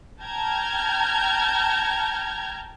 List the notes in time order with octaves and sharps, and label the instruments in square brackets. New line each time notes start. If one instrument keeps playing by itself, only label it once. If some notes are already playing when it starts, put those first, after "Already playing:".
[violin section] G5 A5 A#5 F6 G6 G#6